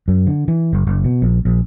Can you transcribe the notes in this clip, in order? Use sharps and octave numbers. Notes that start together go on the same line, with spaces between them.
F#2
D3
E3
F#1
F#1
B2
A#1
A#1